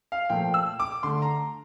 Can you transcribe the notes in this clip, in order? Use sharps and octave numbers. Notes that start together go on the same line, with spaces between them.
F5
A#2 F3 A3 G5
E6
D6
D3 A3 C6
A#5